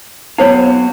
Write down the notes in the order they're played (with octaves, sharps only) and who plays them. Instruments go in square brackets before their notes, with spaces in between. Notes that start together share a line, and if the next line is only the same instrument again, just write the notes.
[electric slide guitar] F#3 B3 F5 [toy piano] D#4 C5 C#5